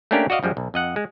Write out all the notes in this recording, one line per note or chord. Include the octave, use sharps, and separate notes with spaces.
A3 A#3 C#4 D4 G4 A#4
F#4 D5 D#5 F5
F#2 F3 G3 G#3
B1
F2 D#5 F#5
G#3